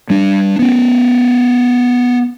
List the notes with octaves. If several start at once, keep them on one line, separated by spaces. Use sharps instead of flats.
G3 D4
B3 C#4